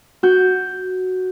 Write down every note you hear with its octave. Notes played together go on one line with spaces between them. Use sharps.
F#4 G6